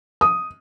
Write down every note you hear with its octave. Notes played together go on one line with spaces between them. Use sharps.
D#6